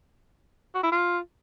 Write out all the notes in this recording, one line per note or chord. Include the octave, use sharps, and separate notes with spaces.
F#4
E4
F4